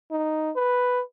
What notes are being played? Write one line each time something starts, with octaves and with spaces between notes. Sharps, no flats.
D#4
B4